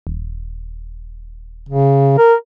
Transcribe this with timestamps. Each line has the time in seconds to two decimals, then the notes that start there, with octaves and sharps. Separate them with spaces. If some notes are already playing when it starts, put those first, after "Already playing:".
0.07 D#1
1.69 C#3
2.18 A#4